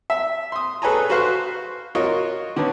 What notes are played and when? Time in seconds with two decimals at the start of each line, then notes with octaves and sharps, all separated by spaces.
0.10 E5
0.52 C6 D#6
0.82 G#4 A4 B4 C#5 G#5 A#5
1.10 F#4 B4 C5 F5 C#6 F#6
1.95 F4 F#4 A#4 C#5 D#5
2.56 D3 D#3 B3 C#4